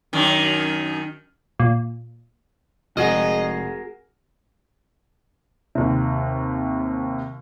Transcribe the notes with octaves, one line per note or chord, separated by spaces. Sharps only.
F#2 D#3
A#2
F1 G#3 F#4 G#4 A#4 D#5 F#5 F6
D#2 C3